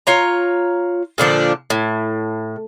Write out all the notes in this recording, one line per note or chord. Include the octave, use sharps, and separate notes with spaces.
F4 C#5 A#5
A#2 D3 F3 D4
A2